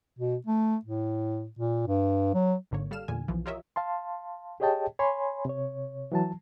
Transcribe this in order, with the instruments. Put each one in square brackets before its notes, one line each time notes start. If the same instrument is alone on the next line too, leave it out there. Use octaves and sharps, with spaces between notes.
[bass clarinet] B2
A3
A2
A#2
G2
F#3
[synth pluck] G#1 G#2 D3 A#3 C#5
G3 A4 F5 F6 E7
E2 A#2 D3 G#5
B1 E3 F3
F4 G4 A#4 C#5 D#5 E5
[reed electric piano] F5 A5 C6
G4 G#4 C#5 D#5 G5 A5
C#5 G#5 B5 C6
C3 C#5
E3 F#3 A5